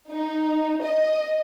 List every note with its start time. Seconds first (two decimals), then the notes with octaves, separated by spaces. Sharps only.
0.10 D#4
0.83 D#5